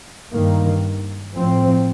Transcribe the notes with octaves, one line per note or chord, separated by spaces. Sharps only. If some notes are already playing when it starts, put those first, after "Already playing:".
G2 D#3 A#3
A2 F3 C4